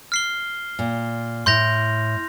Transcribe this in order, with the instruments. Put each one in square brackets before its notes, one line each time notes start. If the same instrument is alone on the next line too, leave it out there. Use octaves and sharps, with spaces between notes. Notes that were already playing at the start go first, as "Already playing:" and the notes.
[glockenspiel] F6 C7 G7
[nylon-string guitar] A#2
[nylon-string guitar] A2 [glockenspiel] C6 G6 A#6 F7